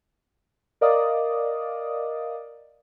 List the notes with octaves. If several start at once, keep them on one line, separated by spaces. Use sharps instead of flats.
A#4 D5 D#5 F5 D6 D#6